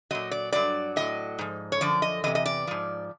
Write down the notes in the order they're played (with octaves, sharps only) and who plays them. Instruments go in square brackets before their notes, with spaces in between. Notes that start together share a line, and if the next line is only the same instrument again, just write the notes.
[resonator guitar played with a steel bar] A#2 F#3 D#5
D5
G2 D#3 F#3 D5
A2 F#3 D#5
G#2 F3
C#5
F#2 D3 F3 D5
D#5
E3 D#5
E2 C3
D#5
D5
G#2 F3